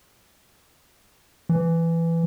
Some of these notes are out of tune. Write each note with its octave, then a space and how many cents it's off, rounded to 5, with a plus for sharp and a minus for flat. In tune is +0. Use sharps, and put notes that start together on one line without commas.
E3 +15